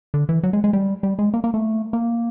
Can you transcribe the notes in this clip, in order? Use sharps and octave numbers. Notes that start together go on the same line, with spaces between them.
D3
E3
F#3
G#3
G#3
G3
G3
G#3
A#3
A#3
A3
A#3